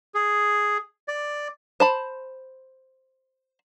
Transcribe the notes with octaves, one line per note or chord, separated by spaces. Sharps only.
G#4
D5
C5 A5 B5